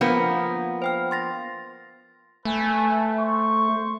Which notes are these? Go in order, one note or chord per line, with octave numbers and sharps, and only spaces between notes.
F3 A#3 B3 D4 F#5
C5 G5 F6
C6 A6 A#6
A3 B4 G#5
C5 C#6